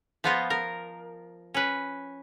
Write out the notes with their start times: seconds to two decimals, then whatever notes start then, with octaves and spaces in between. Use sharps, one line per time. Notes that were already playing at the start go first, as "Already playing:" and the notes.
0.24 F3 B3 F4 D#5
0.50 A#4
1.54 C#4 B4